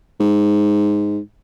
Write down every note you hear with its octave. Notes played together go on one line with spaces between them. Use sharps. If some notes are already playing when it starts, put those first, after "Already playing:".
G#2